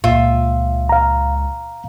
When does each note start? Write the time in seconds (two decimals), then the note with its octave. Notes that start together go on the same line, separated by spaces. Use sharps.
0.04 C#2 A#2 F4 E5
0.89 F5 A#5